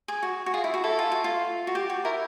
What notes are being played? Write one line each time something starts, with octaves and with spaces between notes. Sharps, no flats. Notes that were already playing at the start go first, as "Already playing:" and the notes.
G#4
F#4
F#4
F4 G#4
E4
F#4
E4 A4
F4
F#4
F4
F#4
G4
F#4
E4 A#4